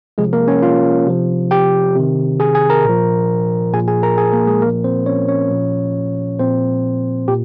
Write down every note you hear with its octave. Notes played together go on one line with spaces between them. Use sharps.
C3 F3 G#3 G#4
A#3 A#4
C#4 C#5
F4 F5
C3 F3
G4 G5
C3 D#3
G#4 G#5
G#4 G#5
A#4 A#5
A#2 F3
A#2 F3 G#4 G#5
G#4 G#5
A#4 A#5
G#4 G#5
A#3 A#4
G#3 G#4
A#2 F3 A#3 A#4
C4 C5
C#4 C#5
C#4 C#5
A#2 F3
A#2 F3 C4 C5
A#2 G4